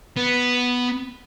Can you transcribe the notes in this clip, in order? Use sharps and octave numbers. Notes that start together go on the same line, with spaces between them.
B3